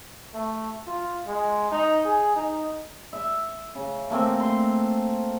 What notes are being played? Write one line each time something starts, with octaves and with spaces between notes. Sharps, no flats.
A3
F4
G#3
D#4
G#4
D#4
E5
C#3
A3 A#3 C4
C6